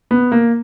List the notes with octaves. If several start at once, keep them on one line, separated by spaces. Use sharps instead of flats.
B3
A#3